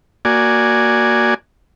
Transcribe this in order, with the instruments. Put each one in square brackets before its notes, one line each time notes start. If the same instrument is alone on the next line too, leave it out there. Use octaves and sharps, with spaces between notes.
[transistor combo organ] A#3 F#4 D5 G#5